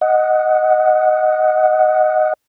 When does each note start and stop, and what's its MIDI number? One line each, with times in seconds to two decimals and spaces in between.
0.01 2.33 75
0.01 2.33 78